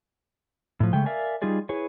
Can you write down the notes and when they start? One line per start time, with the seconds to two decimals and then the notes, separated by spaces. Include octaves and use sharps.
0.80 A2 F3
0.93 C#3 G#3 A3 G5
1.06 A#4 D5 E5 F5 G#5
1.42 G3 D#4 F4 G#4 D5
1.69 E4 G#4 B4 C#5